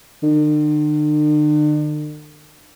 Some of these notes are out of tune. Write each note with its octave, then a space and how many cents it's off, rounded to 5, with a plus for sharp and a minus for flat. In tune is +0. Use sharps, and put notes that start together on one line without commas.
D3 +45